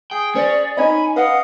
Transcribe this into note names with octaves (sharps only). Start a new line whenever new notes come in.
G#4 G5
C#4 C5 D5
D#4 C#5 D#5 G#5 B5
B4 D#5 F5 F#5